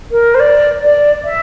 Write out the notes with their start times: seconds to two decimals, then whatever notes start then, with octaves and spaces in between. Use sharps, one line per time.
0.11 A#4
0.34 C5
0.40 D5
0.81 D5
1.25 E5